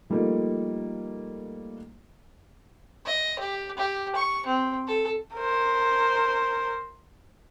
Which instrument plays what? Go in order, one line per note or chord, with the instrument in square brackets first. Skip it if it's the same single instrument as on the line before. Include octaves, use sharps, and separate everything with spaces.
[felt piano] F3 G3 A3 A#3 D#4
[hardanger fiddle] D#5
G4
G4
C#6
C4
A4
[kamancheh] A#4 C5